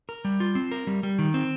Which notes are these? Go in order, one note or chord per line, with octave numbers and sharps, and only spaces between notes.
A#4
G3
F4
C4
A#4
G3
G3
D#3
C4